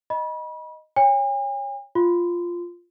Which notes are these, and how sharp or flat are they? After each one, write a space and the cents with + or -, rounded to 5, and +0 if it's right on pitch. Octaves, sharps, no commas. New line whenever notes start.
D#5 +0 B5 -30
C#5 +0 G#5 -45
F4 +0 C6 -25